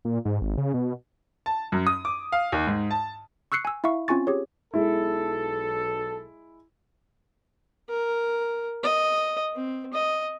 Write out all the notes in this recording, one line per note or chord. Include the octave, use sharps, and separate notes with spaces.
A#2
G#2
G#1
C#3
B2
A5
F#2
D#6
D6
F5
D#2
G#2
A5
C#6 E6 F#6 C7 C#7
G#5 E6
E4 E5 F5 C#6
C4 C#4 F4 G#5 C#6 A6
G4 G#4 C#5
B1 G#3 E4 A4
A#4
D#5
C4
D#5